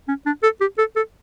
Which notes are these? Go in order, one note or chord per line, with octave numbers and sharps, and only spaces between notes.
C#4
D4
A4
G4
A4
A4